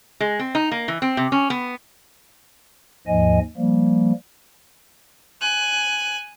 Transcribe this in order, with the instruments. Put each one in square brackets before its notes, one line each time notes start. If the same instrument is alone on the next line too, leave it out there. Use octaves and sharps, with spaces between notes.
[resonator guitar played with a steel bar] G#3
C4
D#4
A#3
E3
C4
C3
C#4
B3
[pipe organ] D#2 G#2 F3 D#5 G#5
F3 G3 A#3
[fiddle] G#5 F#6